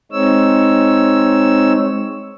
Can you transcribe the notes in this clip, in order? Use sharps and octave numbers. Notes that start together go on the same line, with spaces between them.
G#3 C4 D#4 C#5 E6